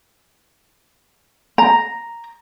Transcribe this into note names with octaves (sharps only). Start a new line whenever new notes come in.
A#5